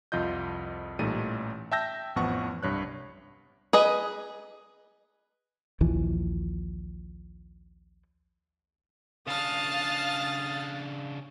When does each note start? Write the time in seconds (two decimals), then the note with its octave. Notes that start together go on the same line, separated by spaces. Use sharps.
0.12 C2 F2 F4 D#5 G6
0.99 A1 A#2 G3 A3 D#4 D#7
1.71 E5 G5 A5 E6 G6 A#6
2.16 A1 F2 F3 B3 F#5 C#6
2.63 C2 G2 C#5 F#6
3.73 G#4 B4 D#5
5.81 A#1 D#2 E3 F3
9.27 C#3 D4 F5 A5 D#6 F6 A6